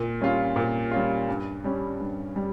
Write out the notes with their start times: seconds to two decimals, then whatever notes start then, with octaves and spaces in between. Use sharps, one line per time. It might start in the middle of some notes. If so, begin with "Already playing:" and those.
Already playing: A#2
0.21 G3 C#4 F4
0.56 A#2
0.91 G3 C#4 F4
1.29 G2
1.64 G3 C#4
2.00 G2
2.36 G3